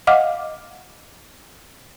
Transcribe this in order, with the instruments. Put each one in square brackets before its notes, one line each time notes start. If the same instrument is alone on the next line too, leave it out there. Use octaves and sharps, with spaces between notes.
[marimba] D#5 F5 F#5 D6 F6